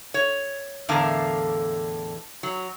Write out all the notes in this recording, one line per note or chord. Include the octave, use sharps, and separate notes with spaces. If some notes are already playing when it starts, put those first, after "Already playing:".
C#5
E2 A2 D3 A#4 F5 A5
F#3